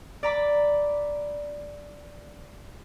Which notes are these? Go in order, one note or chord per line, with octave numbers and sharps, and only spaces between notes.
D5 A#5 B5 D6